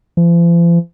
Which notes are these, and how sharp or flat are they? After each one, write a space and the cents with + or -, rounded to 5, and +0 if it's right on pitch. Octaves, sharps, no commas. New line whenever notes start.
F3 -45